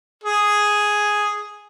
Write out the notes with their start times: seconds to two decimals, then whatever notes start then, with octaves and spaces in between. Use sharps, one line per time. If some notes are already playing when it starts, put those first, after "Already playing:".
0.24 G#4